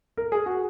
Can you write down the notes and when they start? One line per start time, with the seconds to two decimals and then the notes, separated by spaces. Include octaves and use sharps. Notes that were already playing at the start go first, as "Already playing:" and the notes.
0.17 A#4
0.32 G#4
0.46 F#4